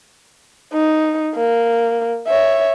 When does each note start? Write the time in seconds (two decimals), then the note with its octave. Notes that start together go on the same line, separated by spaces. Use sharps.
0.73 D#4
1.35 A#3
2.28 C#5 E5